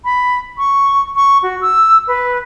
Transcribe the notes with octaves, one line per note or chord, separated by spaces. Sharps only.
B5
C#6
C#6
F#4
E6
B4